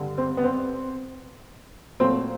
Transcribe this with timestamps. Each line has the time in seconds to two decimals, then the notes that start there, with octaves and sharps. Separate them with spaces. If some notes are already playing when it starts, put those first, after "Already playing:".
Already playing: G2 D3 G3
0.18 C4
0.37 B3
0.44 C4
2.00 A#2 F#3 A3 C4